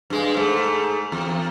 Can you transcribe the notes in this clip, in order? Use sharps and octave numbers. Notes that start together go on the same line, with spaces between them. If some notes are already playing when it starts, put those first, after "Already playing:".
G2 G#3
G#2 A3
E2